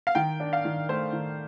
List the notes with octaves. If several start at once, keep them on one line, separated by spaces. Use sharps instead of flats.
F5
D#3 G5
D4
F5
D#3
A3 C5
D#3